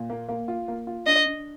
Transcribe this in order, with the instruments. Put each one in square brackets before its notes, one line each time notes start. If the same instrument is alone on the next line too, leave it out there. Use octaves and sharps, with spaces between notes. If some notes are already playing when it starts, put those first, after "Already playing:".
Already playing: [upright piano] A#2
A#3
A#3
F4
A#3
F4
[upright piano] D4 [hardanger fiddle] D#5
[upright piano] D4